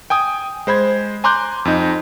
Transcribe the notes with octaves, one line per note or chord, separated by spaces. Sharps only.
G5 G#5 D#6
G#3 C5 B5 G#6
G#5 A#5 C6 D6 F#6 G6
F2 D#4